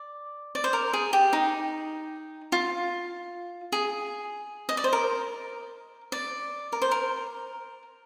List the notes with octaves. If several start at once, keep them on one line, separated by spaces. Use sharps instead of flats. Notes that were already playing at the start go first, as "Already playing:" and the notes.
Already playing: D5
D5
C5
A#4
G#4
G4
D#4
F4
G#4
D#5
D5
C5
A#4
D5
A#4
C5
A#4